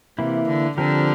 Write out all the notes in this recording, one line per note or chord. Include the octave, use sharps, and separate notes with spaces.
C3 E3 A#3 E4
D3
D3 F3 C4 G4 A#4